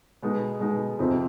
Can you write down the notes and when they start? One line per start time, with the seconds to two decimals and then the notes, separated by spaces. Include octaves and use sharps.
0.23 B2 G#3 B3 D#4
0.60 B2 G#3 B3 D#4
0.99 F2 C3 F3 C4 D#4